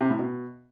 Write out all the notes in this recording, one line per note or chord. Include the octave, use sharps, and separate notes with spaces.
C3
A2
B2